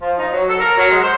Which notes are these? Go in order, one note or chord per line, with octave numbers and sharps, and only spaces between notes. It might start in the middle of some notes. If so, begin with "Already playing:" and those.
F3
D#4
F#3
A4
A#4
F#3
G#3
C5